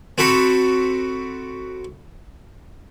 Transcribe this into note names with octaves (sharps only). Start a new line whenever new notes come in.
C4 F#4 A4 B5